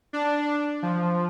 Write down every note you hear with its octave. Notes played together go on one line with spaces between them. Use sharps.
D4
F3